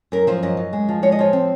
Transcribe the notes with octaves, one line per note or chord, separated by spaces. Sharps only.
F#2 A#4
F3 C5
F#2 D#5
F#2
G#3
F3
G#3 C#5
D#5
F3 C#5
C4